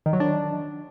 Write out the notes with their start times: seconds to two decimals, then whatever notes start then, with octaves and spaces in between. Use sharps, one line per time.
0.06 D#3
0.13 F#3
0.20 D4